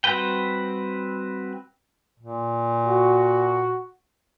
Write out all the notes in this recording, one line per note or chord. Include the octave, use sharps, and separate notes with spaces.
G3 C4 F#4 B4 G5
A#2
F#4